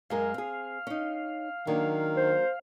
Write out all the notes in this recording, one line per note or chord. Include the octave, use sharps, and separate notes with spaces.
F#2 G#3 A#4 F5
C4 G#4
C#4 D#4
D#3 F#3 A#3 D4
C5